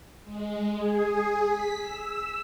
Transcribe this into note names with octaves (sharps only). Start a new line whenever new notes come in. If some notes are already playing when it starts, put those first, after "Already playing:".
G#3
G#4
B6
E6